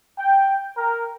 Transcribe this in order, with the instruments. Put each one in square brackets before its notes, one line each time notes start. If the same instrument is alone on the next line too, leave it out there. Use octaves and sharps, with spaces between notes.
[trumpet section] G5
A#4